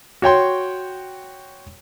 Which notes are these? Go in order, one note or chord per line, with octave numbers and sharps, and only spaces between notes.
F#4 C#5 G5 C6